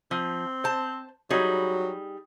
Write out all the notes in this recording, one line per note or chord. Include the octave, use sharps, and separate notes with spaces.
F3 C4
C5 A5
F#3 G3 D#4 G#4